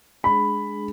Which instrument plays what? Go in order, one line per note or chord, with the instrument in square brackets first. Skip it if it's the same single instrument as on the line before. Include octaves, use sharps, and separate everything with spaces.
[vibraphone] G#3 D4 G#4 [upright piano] B5